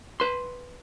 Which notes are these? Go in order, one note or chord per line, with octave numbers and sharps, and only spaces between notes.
B4 C6